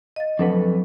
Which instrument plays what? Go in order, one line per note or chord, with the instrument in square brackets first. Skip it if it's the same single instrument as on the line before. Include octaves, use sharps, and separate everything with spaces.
[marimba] D#5 F5 A6
[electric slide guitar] F2 A4 B4 [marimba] F#3 D4